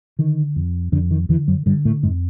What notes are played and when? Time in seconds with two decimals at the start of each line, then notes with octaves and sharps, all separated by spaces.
0.19 D3 D#3
0.56 F2
0.92 F2 D3
1.11 D#3
1.29 E2 D3 E3
1.48 F#2 F#3
1.66 G2 D3 G3
1.85 A2 A3
2.03 F2 G#2 G#3